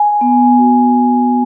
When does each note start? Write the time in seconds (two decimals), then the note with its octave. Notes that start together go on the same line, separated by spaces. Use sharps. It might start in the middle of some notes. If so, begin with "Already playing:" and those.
Already playing: G#5
0.21 B3
0.58 F#4